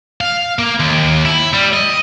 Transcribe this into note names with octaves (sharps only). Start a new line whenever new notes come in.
F5
A#3
D#2
E4
G3
D#5